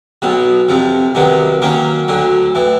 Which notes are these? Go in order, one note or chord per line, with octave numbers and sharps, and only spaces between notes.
B1 B2 F#3
F2 C3 F3
C2 C3 D#3 F#3 B3
D#3 F#3 A#3 C#4
D2 D3 F#3
A2 E3